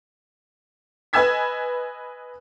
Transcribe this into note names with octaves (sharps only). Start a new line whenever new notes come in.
B4 D#5 G#5 E6 G#6 B6